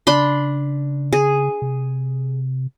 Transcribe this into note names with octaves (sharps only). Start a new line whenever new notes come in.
C#3 D4 B5 C6
C#3 G#4
C3